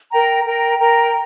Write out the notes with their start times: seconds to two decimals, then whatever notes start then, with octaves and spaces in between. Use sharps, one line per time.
0.10 A#4 G5 A#5
0.45 A#4 G5 A#5
0.80 A#4 G5 A#5